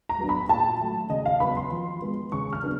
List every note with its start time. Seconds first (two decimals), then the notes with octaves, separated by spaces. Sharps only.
0.09 A#5
0.18 F#3 B3 D4
0.29 B5
0.49 A#2 A5
0.80 F#3 A3
1.10 C#3 D#5
1.26 F5
1.40 F#3 B3 B5
1.57 C6
1.71 F3
2.02 G#3 B3
2.32 C#3 C#6
2.53 F6
2.63 F#3 B3 D4